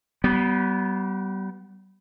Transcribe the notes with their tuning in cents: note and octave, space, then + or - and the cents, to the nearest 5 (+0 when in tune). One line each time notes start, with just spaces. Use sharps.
G3 -35 B3 +0